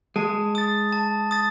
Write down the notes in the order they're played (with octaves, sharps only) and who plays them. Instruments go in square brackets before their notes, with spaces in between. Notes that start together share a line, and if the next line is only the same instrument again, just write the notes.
[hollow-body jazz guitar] G#3 [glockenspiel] A5
[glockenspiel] D#6 A6
A5
D#6 A6